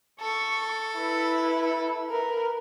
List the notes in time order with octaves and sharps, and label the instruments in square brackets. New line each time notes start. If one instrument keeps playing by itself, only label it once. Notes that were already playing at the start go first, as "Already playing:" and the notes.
[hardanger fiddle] A4 [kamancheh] C#6
[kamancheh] E4 B4
A#4 B4